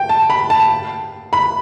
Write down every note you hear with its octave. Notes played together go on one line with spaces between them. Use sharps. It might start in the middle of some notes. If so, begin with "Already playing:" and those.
Already playing: G5
A5
B5
A5
B5